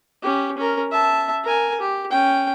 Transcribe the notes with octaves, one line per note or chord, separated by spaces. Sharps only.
C#4 G4
C#4 A#4
E5 A5
A#4 G#5
G4
C#4 G5